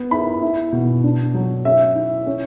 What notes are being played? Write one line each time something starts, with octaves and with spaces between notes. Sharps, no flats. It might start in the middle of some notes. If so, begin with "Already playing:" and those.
Already playing: B3
E4 B5
E4
B2
D4
F#3
C#4 E5
E4
C#4